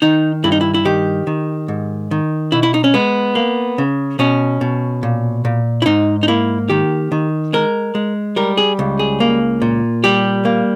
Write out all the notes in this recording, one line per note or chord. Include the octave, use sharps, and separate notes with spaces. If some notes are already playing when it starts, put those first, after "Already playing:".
D#3 D#4
G2 E4
D#4
E4
E4
D#3 G4
D#3
G#2
D#3
B2 E4
E4
D#4
C#4
G#3 B3
A#3
C#3
B2 C#4
B2
A#2
A#2
E4
G#2 D#4
D#4
A#3 E4
D#3 G4
D#3
G#3 A#4
G#3
G3 A#4
G#4
C#2
G#4
A#3
A#2
G3 G4
A#3